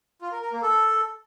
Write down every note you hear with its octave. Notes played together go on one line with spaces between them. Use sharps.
F4
A#4
A#4
A#3
A4